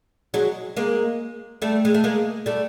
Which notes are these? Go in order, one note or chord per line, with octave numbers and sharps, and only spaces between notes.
F#3 G#3
G#3 A#3
G3 A3
G#3
A3
G#3 A#3
G3 A3